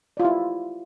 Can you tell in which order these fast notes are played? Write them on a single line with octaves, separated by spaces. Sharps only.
D5 F4 G4 E4